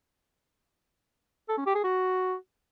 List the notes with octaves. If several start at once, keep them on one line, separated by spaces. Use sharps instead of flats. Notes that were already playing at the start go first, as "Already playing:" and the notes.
A4
C#4
G4
G#4
F#4